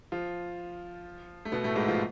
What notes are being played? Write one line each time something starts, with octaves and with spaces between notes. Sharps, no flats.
F3 F4
A3
B2 B3
A2 A3
G#2 G#3
F3 F4